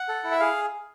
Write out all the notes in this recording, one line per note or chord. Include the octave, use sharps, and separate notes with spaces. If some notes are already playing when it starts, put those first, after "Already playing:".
Already playing: F#5
A4
E4
E5
G#4 F5